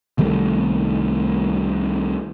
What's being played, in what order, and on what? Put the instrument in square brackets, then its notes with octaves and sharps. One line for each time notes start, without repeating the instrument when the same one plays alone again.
[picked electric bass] C2 D#3 G3 A3